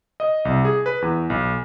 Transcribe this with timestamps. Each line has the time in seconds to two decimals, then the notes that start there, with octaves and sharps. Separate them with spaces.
0.20 D#5
0.45 C2
0.65 G#4
0.86 B4
1.02 E2
1.30 B1